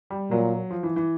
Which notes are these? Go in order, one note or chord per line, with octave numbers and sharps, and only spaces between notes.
G3
A#2 F#3
F3
E3
E3